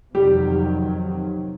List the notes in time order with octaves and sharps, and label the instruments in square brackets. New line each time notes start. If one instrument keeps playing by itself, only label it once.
[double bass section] F2 C3 D#3 F#3 [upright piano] G3 G4